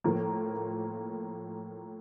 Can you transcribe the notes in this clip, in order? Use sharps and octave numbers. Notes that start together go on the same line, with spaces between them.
A2 F3 A#3